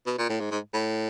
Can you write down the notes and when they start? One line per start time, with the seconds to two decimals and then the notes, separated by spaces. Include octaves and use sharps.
0.06 B2
0.18 A#2
0.29 A2
0.40 G#2
0.51 G#2
0.73 A2